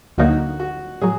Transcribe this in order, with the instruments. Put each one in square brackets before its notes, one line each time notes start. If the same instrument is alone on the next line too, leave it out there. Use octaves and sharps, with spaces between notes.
[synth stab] D2 D3 F#3 A#3 D#4 [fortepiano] F#4
[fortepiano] F#4
[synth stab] A2 F#3 [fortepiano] G#4